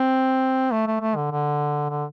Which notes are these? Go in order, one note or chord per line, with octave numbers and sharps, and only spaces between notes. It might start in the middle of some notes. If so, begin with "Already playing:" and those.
Already playing: C4
A3
A3
A3
D3
D3
D3